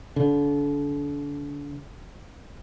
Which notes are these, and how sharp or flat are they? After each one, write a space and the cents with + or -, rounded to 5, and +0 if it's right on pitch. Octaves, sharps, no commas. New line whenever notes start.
D3 -35